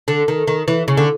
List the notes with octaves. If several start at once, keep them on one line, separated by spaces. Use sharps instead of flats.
D3
D#3
D#3
E3
C#3
D3